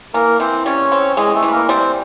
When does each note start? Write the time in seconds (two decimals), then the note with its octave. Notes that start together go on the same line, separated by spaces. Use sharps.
0.14 E3 A#3 A#4
0.40 E3 C4 C5
0.66 G3 C#4 C#5
0.92 C4
1.17 E3 G#3 G#4
1.34 A3 A4
1.43 E3 B4
1.52 A#3 A#4
1.69 G3 C4 C5